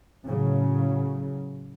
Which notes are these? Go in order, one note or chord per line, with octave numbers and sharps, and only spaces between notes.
A2 C#3 F#3